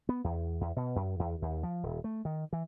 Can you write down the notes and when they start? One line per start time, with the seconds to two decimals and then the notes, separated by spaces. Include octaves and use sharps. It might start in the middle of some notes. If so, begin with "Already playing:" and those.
0.09 B3
0.24 E2
0.61 E2
0.76 B2
0.96 F#2
1.19 E2
1.42 D#2
1.63 F3
1.83 D#1
2.04 A3
2.25 D#3
2.53 E3